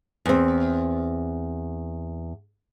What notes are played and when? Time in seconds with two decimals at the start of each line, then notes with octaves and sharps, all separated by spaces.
0.26 E2 C4